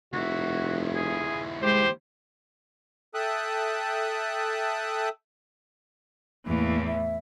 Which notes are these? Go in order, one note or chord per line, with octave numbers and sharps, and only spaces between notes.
F1 D#2 E4 F#4
G#4
G#3 G4 C5
A4 E5 G5 A5 D#6 F#6
E2 A2 E3 A#3
E5